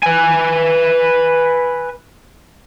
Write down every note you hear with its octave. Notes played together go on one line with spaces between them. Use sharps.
B4 G#5